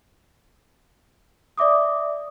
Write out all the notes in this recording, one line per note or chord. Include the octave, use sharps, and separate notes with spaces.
D5 E5 D6 D#6